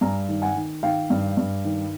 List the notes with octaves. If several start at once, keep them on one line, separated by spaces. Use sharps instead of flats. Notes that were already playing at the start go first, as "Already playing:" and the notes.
G2 G#5 A#5
D#3
F#5 G#5
D#3
D#3 F5 G5
G2
G2
D#3